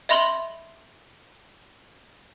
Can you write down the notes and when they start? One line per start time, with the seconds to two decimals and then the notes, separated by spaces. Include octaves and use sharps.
0.09 D#5 E5 B5 C6 F#7 G7